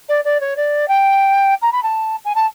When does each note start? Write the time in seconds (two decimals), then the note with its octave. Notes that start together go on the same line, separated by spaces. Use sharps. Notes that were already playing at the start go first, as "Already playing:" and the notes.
0.09 D5
0.25 D5
0.41 C#5
0.57 D5
0.88 G5
1.62 A#5
1.72 B5
1.83 A5
2.25 G#5
2.35 A5